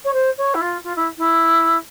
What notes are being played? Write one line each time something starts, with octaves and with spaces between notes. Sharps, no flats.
C#5
C5
C#5
E4
F4
F4
E4
E4